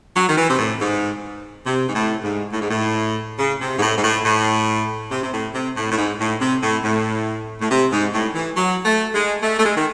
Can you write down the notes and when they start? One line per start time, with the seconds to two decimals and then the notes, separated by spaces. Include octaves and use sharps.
0.16 F#3
0.28 D#3
0.37 E3
0.50 C3
0.58 A2
0.80 G#2
1.66 C3
1.88 G#2
1.95 A2
2.24 G#2
2.52 A2
2.61 G#2
2.70 A2
3.39 C#3
3.60 C3
3.78 G#2
3.82 A2
3.97 G#2
4.04 A2
4.25 A2
5.11 C3
5.23 C3
5.33 A2
5.54 C3
5.76 A2
5.92 A2
5.98 G#2
6.19 A2
6.41 C3
6.62 A2
6.84 A2
7.61 A2
7.70 C3
7.92 G#2
8.13 A2
8.35 E3
8.57 F#3
8.85 A3
9.14 G#3
9.43 A3
9.59 A3
9.64 G#3
9.76 D#3